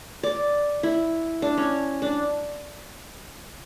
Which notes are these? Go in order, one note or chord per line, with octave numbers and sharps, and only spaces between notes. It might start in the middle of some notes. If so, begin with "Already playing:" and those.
D5
E4
D4
C#4
D4